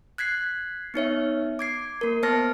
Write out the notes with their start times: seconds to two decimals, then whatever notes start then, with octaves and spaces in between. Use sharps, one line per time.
0.18 F#6 G#6 B6 C7
0.94 B3 D#4 C#5 E5
1.59 D6 G#6 C7
2.01 A#3 A#4
2.23 B3 C5 A5 F6 A#6